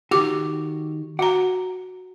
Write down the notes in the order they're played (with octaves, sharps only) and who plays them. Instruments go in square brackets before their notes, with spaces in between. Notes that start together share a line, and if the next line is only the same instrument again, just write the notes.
[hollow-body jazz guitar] D#3 F#4 [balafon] G4 D6
[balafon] F#4 A#5 [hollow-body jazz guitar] F#5